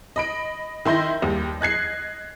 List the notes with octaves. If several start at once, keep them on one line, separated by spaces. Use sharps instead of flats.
D#5 B5 D7
D#3 E4 C6 G6 A#6
D#2 G3
D#5 F#6 G#6 C7